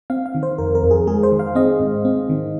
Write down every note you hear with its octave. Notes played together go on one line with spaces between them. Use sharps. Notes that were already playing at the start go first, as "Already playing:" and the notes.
C4 F5
F5
D#3
C5
F2 A#4
A#4
F2
G#4
G#3 G#4
C5
D#3
F5
C4 D#5
G#2
C4
D#3